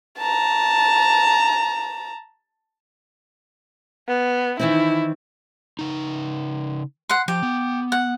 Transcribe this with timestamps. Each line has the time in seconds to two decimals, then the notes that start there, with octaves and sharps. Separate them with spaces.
0.18 A5 A#5
4.08 B3
4.59 D#3 E3 C4 E4
5.79 C#3 D#4
7.09 F#5 C6
7.28 F3 G4
7.43 B3
7.92 F#5